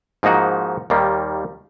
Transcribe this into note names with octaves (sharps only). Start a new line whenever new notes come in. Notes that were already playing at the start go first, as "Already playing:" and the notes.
G#2 F3 A#3 D#4 F#4
D#2 D#3 G3 A#3